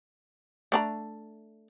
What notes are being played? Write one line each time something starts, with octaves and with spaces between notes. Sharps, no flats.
A3 D4 A#5